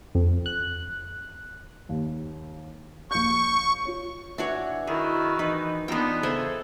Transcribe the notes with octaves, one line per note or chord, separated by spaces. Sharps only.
F2
F#6
D#2
A#1 C#6 G6
F4 C#5
E3 D4 F#4 C#5
D#3 E4 F#4 G#4
E3 D#4 B4
E3 B3 D4 D#4 F4 G5
C#3 G#4 A4 C5 D#5 E5